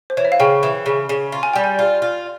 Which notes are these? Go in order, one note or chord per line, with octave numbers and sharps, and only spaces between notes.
C5
E3 C#5
E5
F5
C#3 G5
E3
C#3
C#3
F4
G#5
G3 G5
G#5
F4
F4